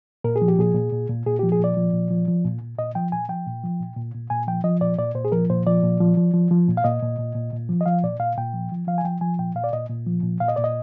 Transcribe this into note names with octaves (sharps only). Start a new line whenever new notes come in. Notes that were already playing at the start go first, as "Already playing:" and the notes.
A#2 A#4
G#4
F3
G4
A#2 G#4
A#2
A#2
A#2
A#2 G#4
G4
F3
G#4
A#2 D5
F3
A#2
F3
F3
A#2
A#2
A#2 D#5
F3 G5
A#2 G#5
F3 G5
A#2
F3
A#2
A#2
A#2
A#2 G#5
F3 G5
F3 D#5
A#2 D5
A#2 D5
A#2 C5
G#4
F3 A#4
A#2 C5
F3 D5
A#2
F3
F3
F3
F3
A#2
F5
A#2 D#5
A#2
A#2
A#2
A#2
F3
D#5
F3 F5
A#2 D5
A#2 F5
A#2 G5
F3
F3
F3 F5
G#5
F3 G5
F3 G#5
A#2 G5
A#2 F5
D5
A#2 D#5
A#2
F3
A#2
A#2 F5
D#5
A#2 D5
D#5